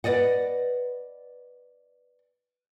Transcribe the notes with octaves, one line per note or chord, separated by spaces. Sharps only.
B4 C5 D5 D#5 F#5